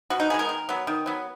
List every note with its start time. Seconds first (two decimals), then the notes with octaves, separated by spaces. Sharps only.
0.10 B2 F#4
0.20 D#4
0.30 B3 G#4
0.34 G#3
0.39 A#4
0.49 D#3
0.69 F#3 B3
0.87 D#3
1.06 F#3 B3